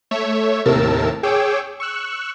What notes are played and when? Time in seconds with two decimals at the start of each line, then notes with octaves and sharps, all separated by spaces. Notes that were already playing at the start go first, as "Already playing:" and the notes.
0.11 A3 C#5 E5
0.65 D#2 A2 C3 A#4 A5 E6
1.23 G#4 C#5 G5 D6 E6
1.80 C#6 E6 F#6